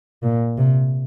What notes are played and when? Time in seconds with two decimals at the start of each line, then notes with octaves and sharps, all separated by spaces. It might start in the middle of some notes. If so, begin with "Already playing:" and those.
0.23 A#2
0.58 C3